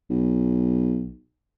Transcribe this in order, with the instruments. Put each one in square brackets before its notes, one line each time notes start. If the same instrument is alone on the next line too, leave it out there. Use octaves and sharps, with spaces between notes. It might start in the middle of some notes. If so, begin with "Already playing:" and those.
[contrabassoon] B1